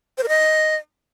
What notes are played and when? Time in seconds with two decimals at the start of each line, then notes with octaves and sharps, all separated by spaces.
0.18 C5
0.23 A#4
0.29 D#5